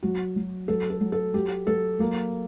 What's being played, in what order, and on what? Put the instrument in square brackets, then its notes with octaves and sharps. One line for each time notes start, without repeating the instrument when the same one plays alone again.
[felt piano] F#3 F#4
F#3
F#3 A4
A4
F#3
A4
F#3 G4
F#3 A4
F#3 A#3